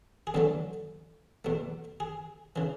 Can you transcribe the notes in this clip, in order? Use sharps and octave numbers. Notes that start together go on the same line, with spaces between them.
G#4
E2 D3 F#3 A3 A4
E2 B2 A3
G#4
C#3 E3